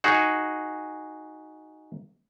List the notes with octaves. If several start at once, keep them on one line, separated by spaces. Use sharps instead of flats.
D#4 F#4 G#4